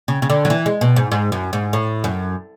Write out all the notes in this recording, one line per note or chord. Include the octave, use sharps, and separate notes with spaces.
C#3
C#3
D3
F#3
E3
G#3
B2
G#2
G#2
F#2
G#2
A2
F#2